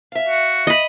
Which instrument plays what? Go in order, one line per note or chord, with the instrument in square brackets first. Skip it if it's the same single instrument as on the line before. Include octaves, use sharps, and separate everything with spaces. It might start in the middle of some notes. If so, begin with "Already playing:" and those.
[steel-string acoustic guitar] E5 F5
[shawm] F#4
[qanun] D#5 B5